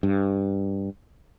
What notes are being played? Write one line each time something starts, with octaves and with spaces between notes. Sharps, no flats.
G2